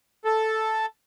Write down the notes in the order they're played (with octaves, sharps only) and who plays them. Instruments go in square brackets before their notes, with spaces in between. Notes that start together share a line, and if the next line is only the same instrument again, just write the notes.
[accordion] A4